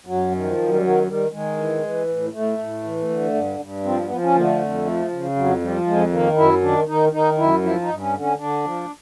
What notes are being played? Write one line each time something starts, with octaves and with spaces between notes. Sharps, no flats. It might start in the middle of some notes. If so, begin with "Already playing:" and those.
F#2 F#3
D#3
F3
F#2
G3
D#3 F#3
D#3 G3
D#3 G#3
E3
E3
A2
A2 A3
A2
E3
D3
G2
G2
F3 C4
B3
F3
C#4
D3 A#3
A3
F2
F3
C#3
F2 F#3
F3 G3
F2 G#3
D#3 A#3
F#2 E4
D#3 D4
D#3 D#4
D#3 D#4
F#2 E4
F3 E4
D#4
G2
C#4
D3
C#4
D3 D4
F3